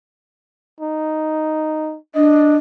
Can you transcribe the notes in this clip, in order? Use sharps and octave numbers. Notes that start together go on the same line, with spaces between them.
D#4
D4 D#5